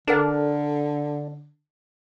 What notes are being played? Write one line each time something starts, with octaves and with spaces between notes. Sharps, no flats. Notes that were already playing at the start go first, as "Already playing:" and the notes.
D3 D4 A4 A#4 F#5